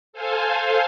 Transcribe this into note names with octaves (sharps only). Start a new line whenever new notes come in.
A4 C5 F5 G#5